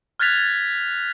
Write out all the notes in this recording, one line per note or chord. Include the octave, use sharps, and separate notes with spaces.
F6 F#6 G#6 A6 B6 F7